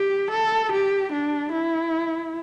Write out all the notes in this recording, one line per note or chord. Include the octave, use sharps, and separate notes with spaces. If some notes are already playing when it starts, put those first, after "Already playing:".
Already playing: G4
A4
G4
D4
E4